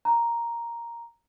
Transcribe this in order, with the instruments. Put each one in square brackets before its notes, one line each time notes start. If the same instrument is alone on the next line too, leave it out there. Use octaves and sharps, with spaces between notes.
[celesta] A#5